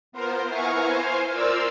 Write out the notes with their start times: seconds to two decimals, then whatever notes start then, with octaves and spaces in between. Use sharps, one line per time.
0.12 B3 F4 A#4 C5
0.48 B3 E4 F5 G#5 A#5 C#6
0.86 C5 F5 G#5
1.32 F4 A#4 C5 D5 F5 E6